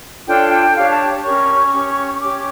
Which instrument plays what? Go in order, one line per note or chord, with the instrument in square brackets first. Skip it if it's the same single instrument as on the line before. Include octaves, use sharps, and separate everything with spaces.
[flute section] D4 F4 A4 C#5 G5
G5
D4 G4 C#5 F5
A5
C#4 G4 A#4 C#5 C#6
C#4 G4 C#5
C#4 G4 C#5 D6